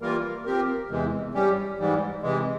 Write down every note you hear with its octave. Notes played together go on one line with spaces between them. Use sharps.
E3 G3 A#3 F4 A#4
F3 C4 G4 A#4
E2 C3 E3 G#3
G2 G3 C#4 G4
G#2 E3 G3
C3 E3 G#3